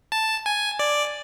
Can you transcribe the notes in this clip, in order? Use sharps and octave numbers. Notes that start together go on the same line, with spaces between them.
A5
G#5
D5